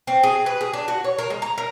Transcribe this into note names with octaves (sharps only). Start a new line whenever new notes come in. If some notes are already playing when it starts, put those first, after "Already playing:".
C4
G#4
B4
G#4
D4
F#4
C#5
A#4
G#3
A#5
A#4